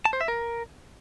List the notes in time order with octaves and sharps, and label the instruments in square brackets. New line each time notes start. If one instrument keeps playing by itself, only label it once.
[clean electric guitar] A5
C5
E5
A#4